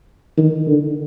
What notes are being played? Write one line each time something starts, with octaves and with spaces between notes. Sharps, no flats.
D#3
D3